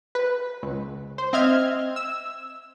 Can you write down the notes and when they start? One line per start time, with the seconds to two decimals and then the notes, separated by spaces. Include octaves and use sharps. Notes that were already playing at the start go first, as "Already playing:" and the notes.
0.15 B4
0.63 C#2
1.18 C5
1.33 C4 D#5 E5 F6 G#6
1.96 E6